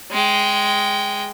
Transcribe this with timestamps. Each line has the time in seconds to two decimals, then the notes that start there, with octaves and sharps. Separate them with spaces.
0.11 G#3 G5